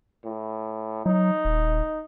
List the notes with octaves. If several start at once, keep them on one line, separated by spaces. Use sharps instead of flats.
A2
F#3 D#4
D#1